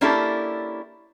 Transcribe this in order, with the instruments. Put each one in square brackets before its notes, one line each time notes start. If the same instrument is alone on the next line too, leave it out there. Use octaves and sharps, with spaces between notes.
[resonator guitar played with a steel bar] A#3 C#4 D4 E4 G4 A4